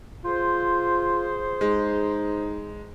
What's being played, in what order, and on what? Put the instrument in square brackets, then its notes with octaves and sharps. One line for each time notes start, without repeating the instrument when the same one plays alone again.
[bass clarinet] F4 [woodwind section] G#4 C5
[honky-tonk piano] G#3 [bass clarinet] D#4